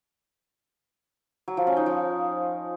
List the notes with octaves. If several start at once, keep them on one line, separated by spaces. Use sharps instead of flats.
F#3
F3
C#4
D#4
F3